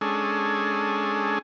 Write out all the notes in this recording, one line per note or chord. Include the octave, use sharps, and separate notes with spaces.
G#3 C#4 D4 G#4 A4